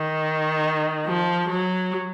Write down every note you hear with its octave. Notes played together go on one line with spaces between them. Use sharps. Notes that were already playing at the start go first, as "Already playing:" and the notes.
Already playing: D#3
F3
F#3